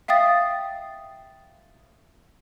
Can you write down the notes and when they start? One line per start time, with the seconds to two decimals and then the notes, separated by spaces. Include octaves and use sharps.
0.08 E5 F5 G5 D#6 A6